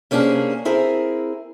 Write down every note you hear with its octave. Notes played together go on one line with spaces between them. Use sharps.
C3 A#3 C#4 D4 G#4
C4 E4 G#4 A#4